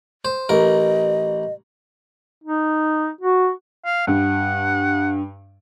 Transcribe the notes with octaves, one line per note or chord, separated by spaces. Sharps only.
C5
A1 A#4 D#5
D#4
F#4
F5
G2 F#5